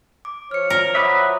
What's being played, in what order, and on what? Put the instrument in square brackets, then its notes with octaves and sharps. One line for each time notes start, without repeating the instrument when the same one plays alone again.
[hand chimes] D6
[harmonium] F3 C#5 [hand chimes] F6 C#7
[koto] A#4 [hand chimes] D5 A#5
[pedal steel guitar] F#4 B4 E5 [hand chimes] D6 D#6